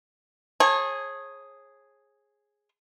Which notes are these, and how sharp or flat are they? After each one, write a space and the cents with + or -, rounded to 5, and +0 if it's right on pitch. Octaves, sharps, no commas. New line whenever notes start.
G#4 +0 C#5 -40 A5 +15